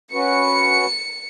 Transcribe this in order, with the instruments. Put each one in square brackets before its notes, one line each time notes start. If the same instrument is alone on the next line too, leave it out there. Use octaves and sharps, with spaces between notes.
[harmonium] C#4 F#4 B4 [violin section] C#7